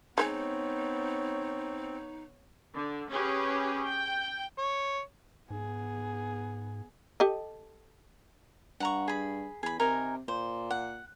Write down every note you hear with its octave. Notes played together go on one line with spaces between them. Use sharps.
G#3 B3 C4 D#4 C5 C#5 G#5
D3
C#4 G4 G#4 B4
G5
C#5
G#2 B3 G#4
G4 A4 D#5
G2 F#5 A#5 C#6
G#4 B5
E2 G#4 B5
C3 D#4 A#4 G#5
A#2 C5
F#5